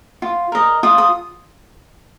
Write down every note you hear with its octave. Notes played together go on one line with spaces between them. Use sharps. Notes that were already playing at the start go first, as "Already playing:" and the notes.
F4
A#4 D#5
F4 D#6
D#6